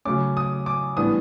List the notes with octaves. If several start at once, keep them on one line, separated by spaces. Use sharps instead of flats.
C#3 F#3 A3 C#4 D6
D#6
D6
A2 E3 G3 B3 D4 D#6